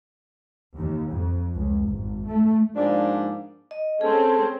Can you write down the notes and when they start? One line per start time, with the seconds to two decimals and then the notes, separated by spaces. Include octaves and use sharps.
0.75 D#2
1.09 F2
1.54 C#2
1.85 G#1
2.25 A3
2.75 G#2 F3 A#3 D4 D5
3.71 D#5
4.01 C4 C#4 G#4 A4